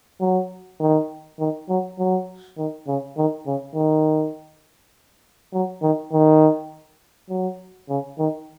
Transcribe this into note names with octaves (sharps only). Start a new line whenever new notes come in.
F#3
D#3
D#3
F#3
F#3
D#3
C#3
D#3
C#3
D#3
F#3
D#3
D#3
F#3
C#3
D#3